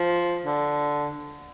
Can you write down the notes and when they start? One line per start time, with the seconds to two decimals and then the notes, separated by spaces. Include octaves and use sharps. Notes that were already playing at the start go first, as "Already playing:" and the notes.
Already playing: F3
0.45 D3